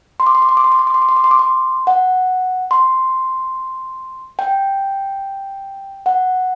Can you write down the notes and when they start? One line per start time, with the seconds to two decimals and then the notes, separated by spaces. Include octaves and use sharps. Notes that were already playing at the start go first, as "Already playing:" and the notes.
0.20 C6
0.27 D6
0.35 C6
0.42 D6
0.49 C6
0.57 D6
0.64 C6
0.72 D6
0.79 C6
0.87 D6
0.94 C6
1.02 D6
1.09 C6
1.16 D6
1.24 C6
1.31 D6
1.39 C6
1.87 F#5
2.71 C6
4.39 G5
6.06 F#5